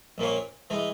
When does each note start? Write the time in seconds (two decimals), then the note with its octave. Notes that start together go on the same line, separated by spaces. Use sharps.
0.18 A#1 A#2 A#3 C#4
0.70 E3 G#3 D#4